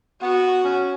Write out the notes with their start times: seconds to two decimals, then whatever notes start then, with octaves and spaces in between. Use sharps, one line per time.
0.22 B3 F#4
0.64 C#4